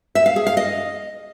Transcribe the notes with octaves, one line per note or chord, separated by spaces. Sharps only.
E5
F5
G#4
F5
D#5